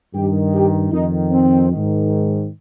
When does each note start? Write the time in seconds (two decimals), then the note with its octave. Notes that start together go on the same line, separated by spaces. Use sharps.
0.13 G2 D#3 G4
0.54 G4
0.92 F2 D#3 D#4
1.31 C4
1.71 G#2 D#3